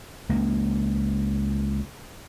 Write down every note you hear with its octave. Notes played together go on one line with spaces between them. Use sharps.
C#2 A#3